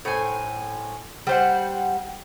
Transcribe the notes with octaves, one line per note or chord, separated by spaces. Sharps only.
A2 C5 G#5
G3 C5 F#5